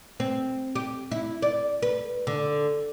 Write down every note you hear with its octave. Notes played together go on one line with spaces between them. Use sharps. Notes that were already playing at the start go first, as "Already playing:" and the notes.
C4
G4
E4
D5
B4
D3